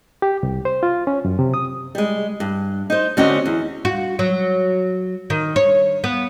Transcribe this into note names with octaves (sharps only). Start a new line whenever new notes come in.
G4
C2
C5
F4
C#4
F#2
C3
D#6
G3 G#3
G2
D#4 C5
D3 C4 C#4 F#4 D#5
E2
F#4
F#3
D#3
C#5
B3